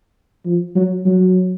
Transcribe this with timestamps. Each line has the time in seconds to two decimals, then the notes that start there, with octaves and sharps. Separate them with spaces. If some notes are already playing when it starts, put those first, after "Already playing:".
0.46 F3
0.76 F#3
1.05 F#3